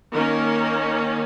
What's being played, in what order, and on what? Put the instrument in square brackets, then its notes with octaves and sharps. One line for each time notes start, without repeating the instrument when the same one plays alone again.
[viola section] D#3 A#3 C#4 A#4